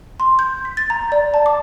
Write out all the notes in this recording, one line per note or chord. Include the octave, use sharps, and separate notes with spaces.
C6
G6
B6
A6
A#5
D5
A5
D6